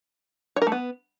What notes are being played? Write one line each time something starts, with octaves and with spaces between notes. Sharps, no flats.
C#5
A#4
A3
B3